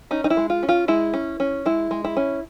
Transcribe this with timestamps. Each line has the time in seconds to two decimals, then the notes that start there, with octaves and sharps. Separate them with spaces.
0.11 C#4 D#4
0.24 D#4
0.30 E4
0.37 G#3
0.50 F4
0.63 C#4
0.69 F4
0.88 G#3 E4
1.14 C#4
1.40 C#4
1.65 G#3 E4
1.91 G#3
2.04 E4
2.17 C#4